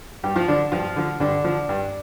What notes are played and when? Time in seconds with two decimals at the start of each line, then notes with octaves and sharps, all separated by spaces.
0.24 G2 G3 G4
0.36 F3 F4
0.48 D3 F3 D4
0.72 G2 F3 F4
0.96 D3 F3
1.20 G2 D3 D4
1.44 D3 F3
1.69 G2